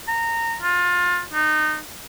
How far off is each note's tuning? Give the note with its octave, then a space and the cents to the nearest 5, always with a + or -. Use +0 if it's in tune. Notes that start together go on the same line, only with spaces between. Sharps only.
A#5 -20
F4 +25
D#4 -20